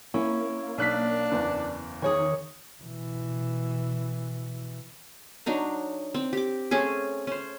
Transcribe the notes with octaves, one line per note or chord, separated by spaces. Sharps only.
A#3 C#4 E4
B1 D4 F#6 B6
F#1 E2
D#3 G#4 C#5 G#5
B2 E3
F#3 D4 D#4 A#5
C4
G4 D6
A3 C4 C#4 G#4
C#4 C5